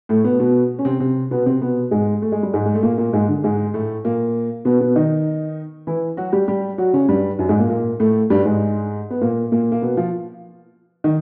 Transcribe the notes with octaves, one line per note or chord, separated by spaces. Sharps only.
A2 A3
B2 B3
B2 B3
C#4
C3 C4
C3 C4
B2 B3
C3 C4
B2 B3
G#2 G#3
A3
G#3
G3
G#2 G#3
G#3
A3
A#2 A#3
A#2 A#3
G#2 G#3
D3
G#2 G#3
A2 A3
A#2 A#3
B2 B3
B2 B3
D#3 D#4
E3 E4
F#3 F#4
G3 G4
G3 G4
F#3 F#4
C#3 C#4
G2 G3
F#2 F#3
G#2 G#3
A#2 A#3
A#2 A#3
A2 A3
G2 G3
G#2 G#3
B3
A#2 A#3
A#2 A#3
A#3
B2 B3
F3 F4
D#3 D#4